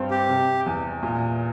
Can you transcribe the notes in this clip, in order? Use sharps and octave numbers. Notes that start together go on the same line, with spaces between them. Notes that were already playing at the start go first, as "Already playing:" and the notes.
Already playing: G2 C4
G4
C3
E2
A#2